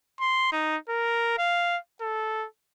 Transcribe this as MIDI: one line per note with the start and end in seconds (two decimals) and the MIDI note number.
0.20 0.48 84
0.52 0.76 63
0.89 1.37 70
1.38 1.77 77
2.01 2.46 69